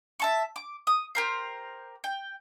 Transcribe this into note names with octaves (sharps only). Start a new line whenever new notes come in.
E5 A5 C#6
D6
D#6
G4 A#4 C5
G5